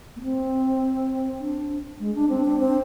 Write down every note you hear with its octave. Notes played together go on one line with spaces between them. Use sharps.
A#3
C4
D4
G#3
D4
C4
D4
C4